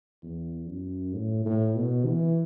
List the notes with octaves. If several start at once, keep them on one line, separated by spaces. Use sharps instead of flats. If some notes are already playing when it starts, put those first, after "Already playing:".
E2
F#2
A2
A2
B2
E3